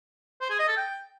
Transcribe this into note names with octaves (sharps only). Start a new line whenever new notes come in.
C5
G#4
D#5
A4
G5